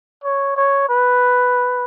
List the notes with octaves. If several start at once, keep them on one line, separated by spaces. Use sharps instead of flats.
C#5
C#5
B4